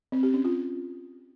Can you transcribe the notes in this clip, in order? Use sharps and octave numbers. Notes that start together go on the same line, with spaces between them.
C4
G4
C#4
F4